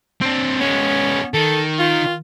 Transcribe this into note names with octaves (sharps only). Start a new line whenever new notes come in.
C4 D4
G#3 B3 C#4
D#3 A4
F4